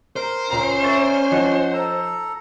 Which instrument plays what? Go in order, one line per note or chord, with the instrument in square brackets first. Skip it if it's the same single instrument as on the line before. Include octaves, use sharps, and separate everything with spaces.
[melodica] A#4 [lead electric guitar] C5
[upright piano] C#2 A#5 [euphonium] C#4
[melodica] A#4 D5 [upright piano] E5 C#6 A6
[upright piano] F3 D#4 [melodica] F#5
[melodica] A4 A#5